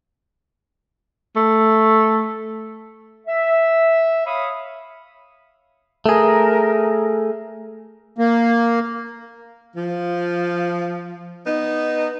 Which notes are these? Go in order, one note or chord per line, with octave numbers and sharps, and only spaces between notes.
A3
E5
C#5 F5 B5 D#6
A3 G#4 A#4
A#3
F3
B3 D#4